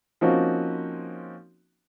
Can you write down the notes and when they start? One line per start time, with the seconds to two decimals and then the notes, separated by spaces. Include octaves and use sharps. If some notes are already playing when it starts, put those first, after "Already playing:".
0.21 F3 A#3 C4 C#4 D#4 F#4